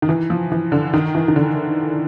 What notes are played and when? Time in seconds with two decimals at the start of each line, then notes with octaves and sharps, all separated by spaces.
0.02 D#3
0.09 E3
0.30 F3
0.52 E3
0.72 D3
0.93 D#3
1.15 E3
1.28 D#3
1.36 D3